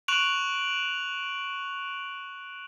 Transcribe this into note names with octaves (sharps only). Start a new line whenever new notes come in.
C#6 F#6 D7 F7 F#7